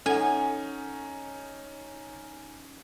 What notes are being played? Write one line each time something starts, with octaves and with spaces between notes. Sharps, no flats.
C#4 D#4 A4 F#5 G#5